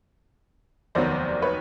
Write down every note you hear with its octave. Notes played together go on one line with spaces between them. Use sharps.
F1 D#2 D#3 F#3 B3 C5 D5
B4 C#5